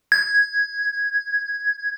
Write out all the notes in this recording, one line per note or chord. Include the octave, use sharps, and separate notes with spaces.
G#6